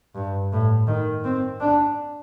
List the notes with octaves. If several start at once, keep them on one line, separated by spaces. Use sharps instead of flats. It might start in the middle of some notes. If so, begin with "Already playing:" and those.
G2
A2
D#3
C4
D4